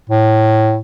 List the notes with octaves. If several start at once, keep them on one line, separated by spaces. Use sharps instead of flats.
A2